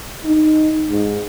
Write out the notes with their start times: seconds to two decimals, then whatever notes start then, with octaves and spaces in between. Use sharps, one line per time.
0.25 D#4
0.89 G#2